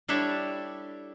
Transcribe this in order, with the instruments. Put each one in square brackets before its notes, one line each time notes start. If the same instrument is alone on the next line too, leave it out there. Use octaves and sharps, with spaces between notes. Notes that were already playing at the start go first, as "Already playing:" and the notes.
[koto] G3 D4 E4 G4 A4 C#5